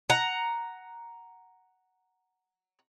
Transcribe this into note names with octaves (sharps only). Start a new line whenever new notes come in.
F#5 A#5